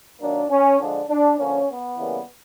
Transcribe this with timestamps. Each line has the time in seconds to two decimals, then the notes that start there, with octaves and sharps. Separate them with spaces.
0.20 D#3 F#3 A#3 D4
0.50 C#4
0.80 D3 F3 G#3 D4
1.10 D4
1.39 D3 F3 A#3 C#4
1.69 B3
1.97 C#3 E3 G3 A#3